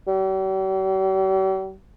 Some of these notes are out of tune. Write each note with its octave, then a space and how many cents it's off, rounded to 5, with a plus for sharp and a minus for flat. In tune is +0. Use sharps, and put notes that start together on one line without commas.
G3 -45